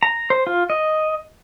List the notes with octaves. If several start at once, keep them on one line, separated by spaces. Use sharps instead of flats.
A#5
C5
F4
D#5